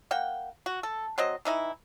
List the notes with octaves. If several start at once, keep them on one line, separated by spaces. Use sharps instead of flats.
A#3 F#5 G5
F#4
A4
F#3 C4 C5 D#5
E3 D#4 E4